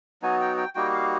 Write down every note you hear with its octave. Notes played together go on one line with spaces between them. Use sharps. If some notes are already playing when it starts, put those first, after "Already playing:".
F#3 B3 D#4 F#4 G#5
G5
G5
G3 A#3 D#4 F#4 G5
F5